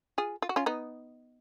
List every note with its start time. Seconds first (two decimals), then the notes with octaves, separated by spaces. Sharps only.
0.18 F4 G#4
0.42 F4
0.49 F#4
0.56 C#4 F4
0.66 B3 D#4